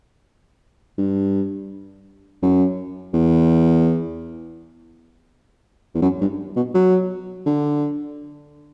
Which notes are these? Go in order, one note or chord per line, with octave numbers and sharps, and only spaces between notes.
G2
F#2
E2
E2
F#2
G2
B2
F#3
D3